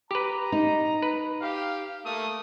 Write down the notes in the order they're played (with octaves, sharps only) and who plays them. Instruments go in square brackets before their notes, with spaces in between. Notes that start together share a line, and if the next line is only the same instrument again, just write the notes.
[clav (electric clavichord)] G4 B4 [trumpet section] A#5
[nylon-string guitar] D#4
[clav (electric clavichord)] B4
[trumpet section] G4 F5
A3 A#3 D#6